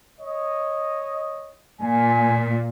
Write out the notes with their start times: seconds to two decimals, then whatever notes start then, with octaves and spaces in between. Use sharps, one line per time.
0.20 C#5 D#5
1.81 A#2 G#5